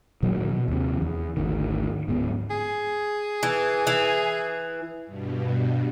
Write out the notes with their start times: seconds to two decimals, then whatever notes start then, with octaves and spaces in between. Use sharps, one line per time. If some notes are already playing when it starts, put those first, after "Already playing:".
0.23 A#2 D#3 E3 F#3
0.48 B2
0.68 D#2 C3
1.02 E2
1.37 G#1 D2 D#3
2.08 D1 G#2 B3
2.50 G#4
3.43 E3
3.87 E3
5.06 G2 B2